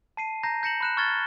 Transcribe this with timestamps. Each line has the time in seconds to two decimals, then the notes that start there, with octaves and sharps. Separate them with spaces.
0.17 A5 C7 D#7
0.43 A#5 G6 A#6 C7
0.63 G6 A#6 C#7 E7 F#7
0.80 B5 F#6 E7
0.97 C#6 F6 F#6 G#6 A6 G7